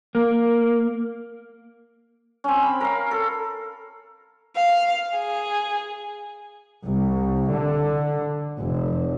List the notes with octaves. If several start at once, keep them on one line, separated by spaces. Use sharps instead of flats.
A#3
C4 C#4
B5
A#4 F5
A4
F5
G#4
C2
D3
F1